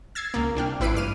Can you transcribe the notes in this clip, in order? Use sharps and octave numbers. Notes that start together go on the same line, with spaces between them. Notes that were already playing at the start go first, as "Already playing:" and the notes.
E6 G#6 A6 C7
C#2 A#3
C2 D4 G5 F6
A1 E4 B4 B6 C7 D7
G2 D6 F6 D#7